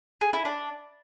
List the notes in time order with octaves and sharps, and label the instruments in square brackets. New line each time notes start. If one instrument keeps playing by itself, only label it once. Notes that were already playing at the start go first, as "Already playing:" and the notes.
[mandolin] G#4
E4
D4